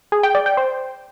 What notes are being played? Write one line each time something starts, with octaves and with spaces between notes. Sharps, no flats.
G#4
G5
D5
G5
C5